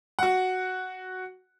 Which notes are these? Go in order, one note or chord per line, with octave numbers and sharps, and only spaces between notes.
F#4 F#5